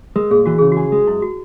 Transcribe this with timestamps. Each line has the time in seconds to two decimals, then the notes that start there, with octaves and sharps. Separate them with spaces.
0.16 G#3 A#4
0.31 A#2 G#4
0.46 E3 F#4
0.59 C#3 G#4
0.72 F#4 G#4
0.92 G#3
1.07 F#2 E4
1.22 F#4